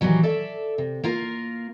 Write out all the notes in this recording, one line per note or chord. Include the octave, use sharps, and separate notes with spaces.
A#2 D#3 E3 F#3 G3
A4 D5 E5
C3
A#3 F4 A#4